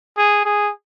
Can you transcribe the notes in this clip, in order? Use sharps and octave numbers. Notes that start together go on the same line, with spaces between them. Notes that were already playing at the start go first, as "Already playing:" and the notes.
G#4
G#4